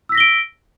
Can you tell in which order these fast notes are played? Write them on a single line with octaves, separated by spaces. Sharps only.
E6 B6 A#6 G7 D7